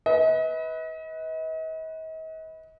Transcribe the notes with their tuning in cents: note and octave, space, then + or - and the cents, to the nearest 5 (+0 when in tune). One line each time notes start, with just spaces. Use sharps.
B4 +0 D#5 +40